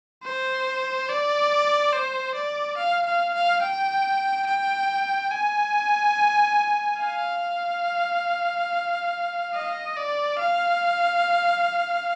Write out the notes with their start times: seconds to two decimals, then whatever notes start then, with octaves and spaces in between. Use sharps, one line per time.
0.24 C5
1.08 D5
1.93 C5
2.35 D5
2.77 F5
3.06 F5
3.34 F5
3.62 G5
4.47 G5
5.31 G#5
7.01 F5
9.55 D#5
9.97 D5
10.39 F5